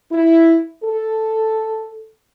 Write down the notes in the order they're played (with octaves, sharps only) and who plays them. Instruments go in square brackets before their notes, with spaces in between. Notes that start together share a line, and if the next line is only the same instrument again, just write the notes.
[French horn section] E4
A4